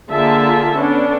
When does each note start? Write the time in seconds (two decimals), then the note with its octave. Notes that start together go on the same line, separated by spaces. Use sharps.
0.11 D3 A#3 F4 G#4 E5 A5
0.77 B3 C#4 D4 A4